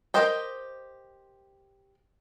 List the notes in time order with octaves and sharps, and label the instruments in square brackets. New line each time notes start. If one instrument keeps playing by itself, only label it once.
[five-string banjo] G4 A#4 C5 D#5 G5